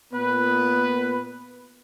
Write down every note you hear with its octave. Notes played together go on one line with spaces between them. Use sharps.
A#2 B3 B4